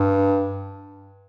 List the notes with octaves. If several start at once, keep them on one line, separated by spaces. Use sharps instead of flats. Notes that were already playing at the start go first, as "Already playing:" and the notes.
Already playing: G2